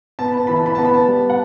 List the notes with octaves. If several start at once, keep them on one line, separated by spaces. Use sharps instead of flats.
B3 A5
B5
A5
E3 B5
A5
B5
B3 A5
B5
A5
G3
F#5